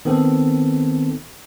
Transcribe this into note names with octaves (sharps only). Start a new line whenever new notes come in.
D#3 B3 C4 A4